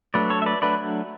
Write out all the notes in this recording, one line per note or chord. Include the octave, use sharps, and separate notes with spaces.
F#3 A3 D4 B4 D5
A4 C#5
E5
B4 D5
F#3 A3 D4 B4 D5